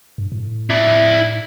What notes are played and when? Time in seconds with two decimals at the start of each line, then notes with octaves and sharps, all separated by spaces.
0.18 G2
0.32 A2
0.70 E4 D5